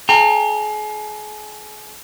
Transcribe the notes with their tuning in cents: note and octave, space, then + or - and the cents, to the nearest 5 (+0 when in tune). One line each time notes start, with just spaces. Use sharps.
G#4 +40 G5 +35 A#5 -30